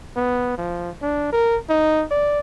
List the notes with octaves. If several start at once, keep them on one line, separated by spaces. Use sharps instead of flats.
B3
F3
D4
A#4
D#4
D5